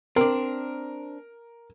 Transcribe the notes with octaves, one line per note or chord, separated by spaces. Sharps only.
C4 D4 A#4